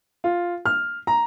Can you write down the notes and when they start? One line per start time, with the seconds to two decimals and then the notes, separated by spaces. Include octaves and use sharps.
0.24 F4
0.66 F6
1.07 A#5